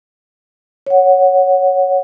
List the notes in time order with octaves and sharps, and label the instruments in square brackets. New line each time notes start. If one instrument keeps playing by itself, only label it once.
[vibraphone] C#5 F#5